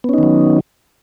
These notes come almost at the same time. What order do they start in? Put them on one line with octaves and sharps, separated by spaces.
B3 C#4 D#4 D#3 F#3